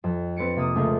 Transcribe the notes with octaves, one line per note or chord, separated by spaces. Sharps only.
F2
C4 B4 A6 C#7 D7
C3 A#3 D#6
C#2 A3 A#4